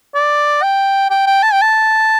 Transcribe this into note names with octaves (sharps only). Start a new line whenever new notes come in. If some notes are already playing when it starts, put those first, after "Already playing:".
D5
G5
G5
G5
A5
G5
A5